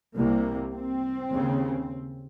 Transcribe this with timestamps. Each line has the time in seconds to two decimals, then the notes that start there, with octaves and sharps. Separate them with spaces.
0.16 C2 C3 A#3
0.73 C4
1.29 D#2 C#3